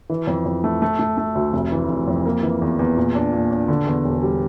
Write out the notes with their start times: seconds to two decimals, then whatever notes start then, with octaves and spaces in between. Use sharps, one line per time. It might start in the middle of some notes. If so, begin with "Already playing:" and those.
0.10 E3
0.27 F2
0.46 F2
0.64 A3
0.82 A3
0.99 A3
1.18 A3
1.35 D2
1.53 F1
1.72 E3
1.90 F1
2.07 F2
2.25 A#3
2.43 E3
2.62 E2
2.79 E2
2.97 A#2
3.15 D4
3.32 A#2
3.51 D4
3.68 D3
3.87 E2
4.04 E1
4.23 G3